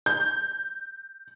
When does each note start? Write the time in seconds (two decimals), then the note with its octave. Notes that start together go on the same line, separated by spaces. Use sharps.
0.06 G6